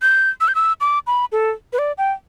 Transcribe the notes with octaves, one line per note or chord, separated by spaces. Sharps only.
G6
E6
G6
E6
D6
B5
A4
B4
D5
G5